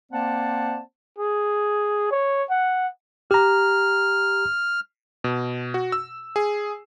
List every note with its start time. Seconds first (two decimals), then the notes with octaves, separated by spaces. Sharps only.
0.12 A#3 C4 C5 D5 F#5 A5
1.18 G#4
2.11 C#5
2.50 F#5
3.31 G4 A#5 F6
5.24 B2
5.74 F#4
5.92 E6
6.36 G#4